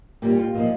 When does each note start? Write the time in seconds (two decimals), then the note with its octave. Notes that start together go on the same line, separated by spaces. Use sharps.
0.22 A#2 G3 G4
0.39 F4
0.55 A#2 F3 D#4